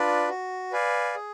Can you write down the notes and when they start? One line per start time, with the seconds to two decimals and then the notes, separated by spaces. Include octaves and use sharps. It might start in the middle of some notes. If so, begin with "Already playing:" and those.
Already playing: D4 F4 B4 D5
0.29 F#4
0.72 B4 D5 F5 G#5
1.15 G#4